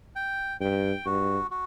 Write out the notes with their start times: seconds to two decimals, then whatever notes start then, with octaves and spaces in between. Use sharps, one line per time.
0.16 G5
0.61 G2 G5
1.05 G2 F#4
1.51 F#4